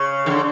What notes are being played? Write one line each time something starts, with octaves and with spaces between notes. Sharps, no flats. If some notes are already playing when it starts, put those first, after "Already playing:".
Already playing: C#3
D#3
D3